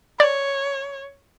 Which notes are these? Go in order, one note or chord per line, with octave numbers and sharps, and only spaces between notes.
C#5 D5